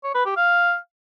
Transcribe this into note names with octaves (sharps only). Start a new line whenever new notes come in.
C#5
B4
G4
F5